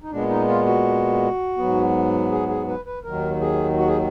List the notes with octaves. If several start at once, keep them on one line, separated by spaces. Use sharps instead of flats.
D#4
A#2 G#3 B3 D4
D#4
F4
F#4
G#2 F#3 B3
G#4
G#4
B4
B4
D#2 D#3 F#3 A#4
G#4
F#4
G#4